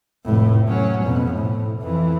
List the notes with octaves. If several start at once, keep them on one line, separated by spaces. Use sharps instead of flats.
F1 A2
F#3 C#4
F2 B2
A2
F2 E3